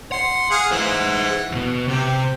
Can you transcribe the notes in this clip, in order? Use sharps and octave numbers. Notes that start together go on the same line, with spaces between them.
F#5 C6
G#4 F5 F#5
E3 G#4 C5 F#5
D#2 B2
C3 G4